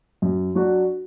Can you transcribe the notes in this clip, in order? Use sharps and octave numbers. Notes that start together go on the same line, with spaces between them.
F#2
F#3 D4 F#4